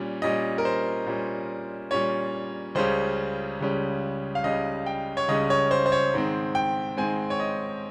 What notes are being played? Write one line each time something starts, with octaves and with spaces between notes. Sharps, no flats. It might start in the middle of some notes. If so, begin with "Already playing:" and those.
Already playing: A#2 G3 C#4
A#2 G3 C#4 D#5
A#4
C5
A#2 G3 C#4
A#2 G3 C#4 C#5
C#2 C#3 G3 C#4 C5
C#2 C#3 G3 C#4
F5
C#2 C#3 G3 C#4 D#5
G5
C#5
C#2 C#3 G3 C#4 D#5
C#5
C5
C5
C#5
G#2 D#3 G#3 C4
G5
G#2 D#3 G#3 C4 G#5
C#5
D#5